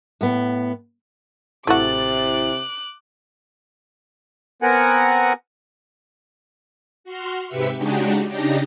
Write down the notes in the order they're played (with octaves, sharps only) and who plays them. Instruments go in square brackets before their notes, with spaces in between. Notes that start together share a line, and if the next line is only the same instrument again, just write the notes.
[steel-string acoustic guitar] A2 B3
[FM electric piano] A1 E4 A6 [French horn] C3 [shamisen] A3 F#4 [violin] D6 F#6
[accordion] B3 C4 A#4 F#5 G#5
[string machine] F#4 C6 F6
G#2 C3 G4 B4 E5 C#7
C#3 G#3 D4 D#4 F#4 G4
C#3 D4 D#4 G4 A#6